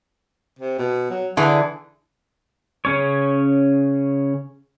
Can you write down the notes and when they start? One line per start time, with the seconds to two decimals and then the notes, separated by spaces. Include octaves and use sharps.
0.59 C3
0.79 B2
1.10 F#3
1.37 D3 E3 G#4
2.85 C#3 C#4 C#5